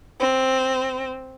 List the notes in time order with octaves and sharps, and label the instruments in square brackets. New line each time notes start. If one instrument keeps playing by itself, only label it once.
[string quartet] C4